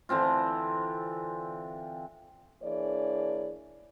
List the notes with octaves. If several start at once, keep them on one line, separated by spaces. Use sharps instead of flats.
D3 E3 C4 F4
E3 A#3 D4 G#4 C#5 D5